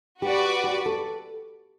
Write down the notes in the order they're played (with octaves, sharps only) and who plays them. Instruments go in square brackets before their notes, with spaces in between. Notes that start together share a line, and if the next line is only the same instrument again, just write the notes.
[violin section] F#4 B4 D5 [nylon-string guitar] G4
[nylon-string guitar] G4
A4